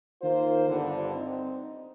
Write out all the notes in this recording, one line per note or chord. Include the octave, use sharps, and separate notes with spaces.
D#3 A#3 F4 C5
G1 G2 D3
C4 D#4